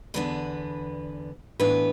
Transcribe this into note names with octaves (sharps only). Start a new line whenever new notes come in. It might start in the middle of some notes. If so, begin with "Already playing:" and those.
E2 D3 B3 D4 B4
A2 E3 B3 D4 B4